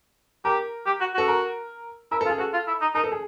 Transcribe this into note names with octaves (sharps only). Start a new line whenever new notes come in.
G4 A#4
G4
F#4
F#4 A4
A#4
E4 A#4
A4
F4
G#4
F#4 A4
F4
E4
D#4
D#4 A#4
A4
G#4